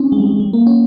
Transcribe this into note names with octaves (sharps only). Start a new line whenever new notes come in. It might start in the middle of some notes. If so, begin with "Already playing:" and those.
Already playing: C4 C#4 D#4
G#3
G3
G#3
G3
A#3
C#4